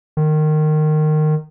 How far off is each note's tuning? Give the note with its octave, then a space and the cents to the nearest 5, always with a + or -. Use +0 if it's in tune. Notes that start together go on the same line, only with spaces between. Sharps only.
D#3 -20